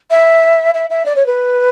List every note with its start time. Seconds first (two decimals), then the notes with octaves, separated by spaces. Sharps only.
0.10 E5
0.74 E5
0.90 E5
1.05 D5
1.16 C#5
1.26 B4